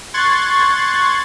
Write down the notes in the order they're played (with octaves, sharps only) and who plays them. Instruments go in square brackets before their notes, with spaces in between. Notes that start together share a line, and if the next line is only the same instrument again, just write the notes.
[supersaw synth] C6 C#6 F#6 G#6 A6